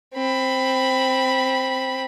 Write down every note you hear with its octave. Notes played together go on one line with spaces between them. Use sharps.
C4 B5